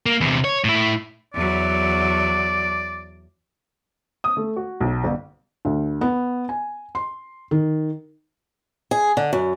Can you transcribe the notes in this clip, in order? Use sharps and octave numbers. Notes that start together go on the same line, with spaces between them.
A#3
E2 C3
C#5
A2 E4
E2 F#3 D5
D#6
A3
F#4
B1
G1
D2
B3
G#5
C6
D#3
G#4
D3
F#2